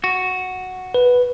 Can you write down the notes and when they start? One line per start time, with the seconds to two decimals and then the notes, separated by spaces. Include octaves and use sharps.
0.04 F#4
0.94 B4